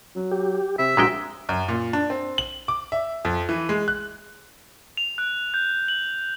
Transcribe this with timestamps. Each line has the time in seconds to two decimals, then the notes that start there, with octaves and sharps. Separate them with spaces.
0.16 F#3
0.31 G4
0.79 C3 E5
0.97 A#1 A#2 G#3 F#4 G5
1.49 F#2
1.68 A#2
1.93 D4
2.10 C4
2.38 F#7
2.68 D6
2.92 E5
3.25 F2
3.49 E3
3.69 G#3
3.88 F#6
4.97 F7
5.18 F#6
5.54 G6
5.88 F#7